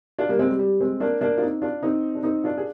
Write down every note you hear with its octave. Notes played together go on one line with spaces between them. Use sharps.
D4 F4
G3 A#3
G#3 C4
G3
G3
G#3 C4
A#3 D4
A#3 D4
F4
C4 D#4
D4 F4
C4 D#4
D4
C4 D#4
D4 F4
G#4